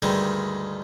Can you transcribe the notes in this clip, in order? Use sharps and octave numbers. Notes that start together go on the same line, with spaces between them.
D2 G2 D#3 G3 G#3